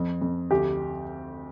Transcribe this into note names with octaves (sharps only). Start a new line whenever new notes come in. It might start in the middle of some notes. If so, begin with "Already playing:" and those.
Already playing: F2
F2
D2 G4